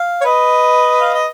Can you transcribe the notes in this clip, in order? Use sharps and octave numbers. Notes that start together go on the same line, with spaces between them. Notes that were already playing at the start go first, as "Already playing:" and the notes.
Already playing: F5
C#5
B4 D#5
F5
D#5